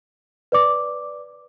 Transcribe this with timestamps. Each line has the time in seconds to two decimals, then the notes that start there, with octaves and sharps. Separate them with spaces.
0.52 B4 D5 D6